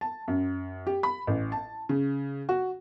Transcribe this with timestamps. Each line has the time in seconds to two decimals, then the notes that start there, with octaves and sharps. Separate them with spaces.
0.01 A5
0.28 F#2
0.87 G4
1.03 B5
1.27 A1
1.52 A5
1.89 C#3
2.49 F#4